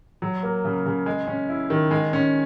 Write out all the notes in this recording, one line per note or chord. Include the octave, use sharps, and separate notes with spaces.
F#3
A#3
C#3
C#3
G#3
C#4
E4
D#3
G#3
C#4